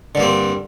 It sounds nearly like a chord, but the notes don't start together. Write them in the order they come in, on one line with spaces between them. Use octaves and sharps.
D3 G2 A#3 C4